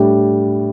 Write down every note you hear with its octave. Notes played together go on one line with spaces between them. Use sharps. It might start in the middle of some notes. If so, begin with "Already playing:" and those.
Already playing: A2 G3 D4 G4